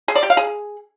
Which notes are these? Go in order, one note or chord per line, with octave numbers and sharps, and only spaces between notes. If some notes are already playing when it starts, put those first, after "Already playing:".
G#4
D5
G4
F5
G#4